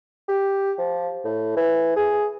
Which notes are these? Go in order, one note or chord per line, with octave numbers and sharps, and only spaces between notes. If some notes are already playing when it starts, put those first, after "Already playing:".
G4
F3
A2
E3
G#4